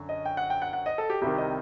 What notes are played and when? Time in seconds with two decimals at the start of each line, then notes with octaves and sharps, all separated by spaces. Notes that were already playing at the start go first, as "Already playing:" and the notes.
Already playing: F#2 D3
0.09 D#5
0.25 G5
0.37 F#5
0.50 G5
0.62 F#5
0.73 F#5
0.86 D#5
0.98 A4
1.10 G4
1.22 C2 C3 D#3 G4
1.38 D#5